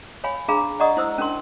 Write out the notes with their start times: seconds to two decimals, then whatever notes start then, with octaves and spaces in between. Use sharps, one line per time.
0.24 C#5 F5 G#5 B5
0.48 D4 G#4 F5 A#5 B5
0.80 D5 D#5 F#5 A#5 C#6 D#6
0.97 E4 C5 D#6 E6
1.18 C#4 D4 A#4 C6